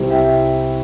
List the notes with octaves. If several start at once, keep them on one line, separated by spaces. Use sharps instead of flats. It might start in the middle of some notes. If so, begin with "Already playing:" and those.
Already playing: C2 C3 G3 C4 E4
E5 G5